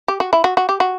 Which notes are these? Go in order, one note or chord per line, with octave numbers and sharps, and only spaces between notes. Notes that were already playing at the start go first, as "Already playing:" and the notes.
G4
F#4
E4
F#4
F#4
G4
F#4